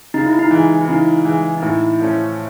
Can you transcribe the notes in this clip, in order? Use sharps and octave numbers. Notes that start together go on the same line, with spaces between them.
C#3 D#4
E4
D#4
E3 G#3
E4
C#3 D#4
E3 G#3
D#4
A2 E4
F3 A3 C#4